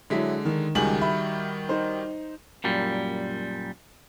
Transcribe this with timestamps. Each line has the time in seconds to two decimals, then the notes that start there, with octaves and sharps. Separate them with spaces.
0.10 D3 F#3 G#3 E4 B6
0.45 D#3
0.75 C#2 D#3 G3 F#4 G#5 F#7
1.01 E5 B5
1.69 D#4 C5
2.64 F#2 A#2 G3